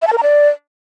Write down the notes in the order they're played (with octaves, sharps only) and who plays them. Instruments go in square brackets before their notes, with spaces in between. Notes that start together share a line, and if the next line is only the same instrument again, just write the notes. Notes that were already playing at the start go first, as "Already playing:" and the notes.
[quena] E5
A5
A#4
A#5
D5